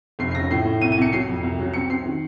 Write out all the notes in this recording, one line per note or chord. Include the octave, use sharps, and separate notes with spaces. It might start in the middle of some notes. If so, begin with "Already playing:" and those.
F1 C7
C7
C#3 A#6
A2 C7
A2
C2 D#7
D#7
C2 C#7
F#3 C7
F2
C2
F#3
C4 C#7
C4 C7
D#3